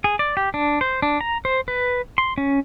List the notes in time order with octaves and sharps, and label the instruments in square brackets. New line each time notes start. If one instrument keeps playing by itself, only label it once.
[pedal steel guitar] G#4
D5
G4
D4
C5
D4
A#5
C5
B4
C6
C#4